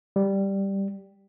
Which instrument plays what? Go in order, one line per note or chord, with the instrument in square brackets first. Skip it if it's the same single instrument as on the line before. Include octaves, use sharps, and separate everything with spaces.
[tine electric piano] G3